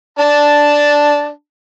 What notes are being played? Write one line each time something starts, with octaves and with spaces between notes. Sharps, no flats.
D4 A5